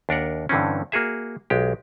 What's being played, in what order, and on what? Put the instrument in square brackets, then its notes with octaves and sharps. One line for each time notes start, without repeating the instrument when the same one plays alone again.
[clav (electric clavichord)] D#2 D4 A#4 F#5
G2 D3 E3 C4 C#4
A#3 F#4 G#4 E5
B1 G#3 G4